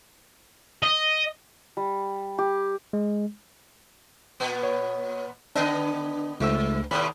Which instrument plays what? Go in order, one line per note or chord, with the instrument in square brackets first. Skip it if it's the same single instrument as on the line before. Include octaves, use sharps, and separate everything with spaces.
[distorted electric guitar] D#5
[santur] G3
G4
[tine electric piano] G#3
[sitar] A#2 B3
[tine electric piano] C#5
[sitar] D3 B3 D#5 [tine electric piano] D4
[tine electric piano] C#2 A3 E6 [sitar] G2
[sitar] D#2 A2 C3 [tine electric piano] B5 D#6